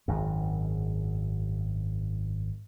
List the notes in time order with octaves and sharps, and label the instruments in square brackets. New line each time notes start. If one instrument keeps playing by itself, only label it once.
[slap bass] G#1 F#2